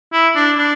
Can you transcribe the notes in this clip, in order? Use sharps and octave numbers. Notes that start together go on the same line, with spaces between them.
E4
D4
D4